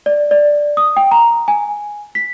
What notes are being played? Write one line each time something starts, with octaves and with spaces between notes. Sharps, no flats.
D5
D5
D#6
G5
A#5
G#5
B6